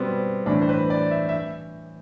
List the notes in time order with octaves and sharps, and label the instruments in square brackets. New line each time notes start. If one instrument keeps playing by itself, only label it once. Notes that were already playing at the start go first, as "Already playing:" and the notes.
Already playing: [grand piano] B2 G3 B3 C4
A2 E3 D4
C5
B4
D5
E5
E5